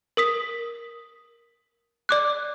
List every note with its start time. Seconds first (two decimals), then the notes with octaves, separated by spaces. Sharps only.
0.17 A#4 D#6 B6
2.09 D5 D6 F#6